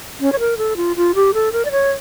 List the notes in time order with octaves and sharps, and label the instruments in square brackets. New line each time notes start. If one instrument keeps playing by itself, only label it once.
[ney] C#4
C#5
A#4
A4
F4
F4
G4
A4
A#4
D5
C#5